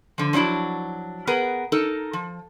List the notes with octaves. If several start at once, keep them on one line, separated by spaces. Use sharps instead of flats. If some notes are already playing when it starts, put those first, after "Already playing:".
D3 F3
F3 F#3 D4 E4 F#4
B3 G#4 A#4 B4
D#4 A4 A#4
F3